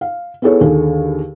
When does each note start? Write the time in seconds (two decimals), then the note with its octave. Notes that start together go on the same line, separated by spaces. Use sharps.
0.01 F5
0.42 B3 E4 G#4 A4 C#5
0.61 D#2 D3 G#4 A4